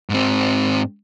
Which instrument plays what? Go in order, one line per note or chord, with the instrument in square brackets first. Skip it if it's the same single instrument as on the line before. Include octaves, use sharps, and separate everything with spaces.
[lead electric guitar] G#2 C4